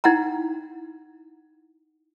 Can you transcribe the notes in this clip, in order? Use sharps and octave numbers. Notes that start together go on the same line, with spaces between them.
D#4 E4 F#5 G5 A#5